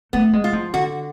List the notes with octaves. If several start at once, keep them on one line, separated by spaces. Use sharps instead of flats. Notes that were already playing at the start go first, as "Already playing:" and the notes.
A3 B3
G#3
F4
F3
D3 F#4